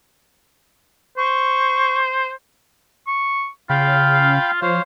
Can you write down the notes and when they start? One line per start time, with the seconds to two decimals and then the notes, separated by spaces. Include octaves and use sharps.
1.18 C5 C#6
3.08 C#6
3.70 C#3 F4 F5 G5 B5
4.62 F3 C5 C#5 F5